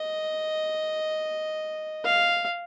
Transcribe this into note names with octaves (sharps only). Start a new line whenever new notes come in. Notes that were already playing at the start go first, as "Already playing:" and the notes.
Already playing: D#5
F5